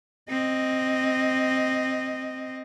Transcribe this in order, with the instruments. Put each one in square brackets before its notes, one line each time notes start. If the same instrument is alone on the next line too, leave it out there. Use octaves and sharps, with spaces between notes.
[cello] C4 D#5